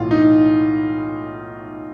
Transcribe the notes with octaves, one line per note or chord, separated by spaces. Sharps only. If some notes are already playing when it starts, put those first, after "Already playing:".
Already playing: B1 A2 E3 F4
D#4